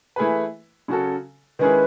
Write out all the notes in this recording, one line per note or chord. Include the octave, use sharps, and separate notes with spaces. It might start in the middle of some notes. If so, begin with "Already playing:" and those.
E3 A3 E4 G#4 B4
C#3 F#3 C#4 F#4 A4
D#3 G#3 C#4 E4 G#4 B4